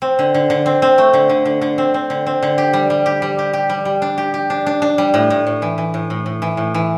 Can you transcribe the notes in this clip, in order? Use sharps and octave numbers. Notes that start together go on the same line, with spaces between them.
C4
D3
D3
D3
C4
C4
A3
D3
D3
D3
D3
C4
C4
D3
C4
D3
G4
G3
G3
G4
G3
G4
G4
G3
G3
D4
G4
G4
D4
D4
D4
G3
A2
A2
A2
E3
E3
A2
A2
A2
E3
A2
E3